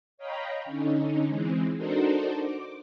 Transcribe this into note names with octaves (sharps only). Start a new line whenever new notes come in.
C#5 D#5 F5 G5 A#5 B5
D3 C#4 D#4
E3 G#3 C4
D4 D#4 F#4 A4 A#4 C5
D6